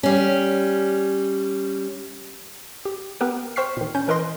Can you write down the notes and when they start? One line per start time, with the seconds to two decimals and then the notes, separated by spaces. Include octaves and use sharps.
0.03 G3 C#4
2.85 G4
3.21 B3 G4 A#4 B4
3.56 C5 G5 C#6 F6 B6 C7
3.77 A#2 D#3
3.95 C#4 G6
4.08 E3 A#4 B4 D#5 C6 A#6